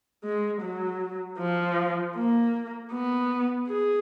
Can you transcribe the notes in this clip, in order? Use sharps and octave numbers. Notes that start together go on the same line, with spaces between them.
G#3
F#3
F3
A#3
B3
G#4